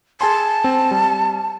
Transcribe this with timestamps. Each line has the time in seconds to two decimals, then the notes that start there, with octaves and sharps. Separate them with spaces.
0.21 G#4 G#5 A5 C6
0.64 C4
0.91 G3